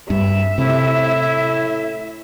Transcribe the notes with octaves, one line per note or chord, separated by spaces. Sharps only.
G2 E5
A2 C3 E4